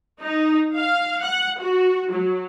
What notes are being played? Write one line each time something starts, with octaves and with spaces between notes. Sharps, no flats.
D#4
F5
F#5
F#4
F#3